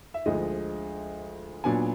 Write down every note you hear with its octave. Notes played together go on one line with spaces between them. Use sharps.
E5
D2 D3 F3 G#3 D#5
A#2 F#3 B3 D4 G#5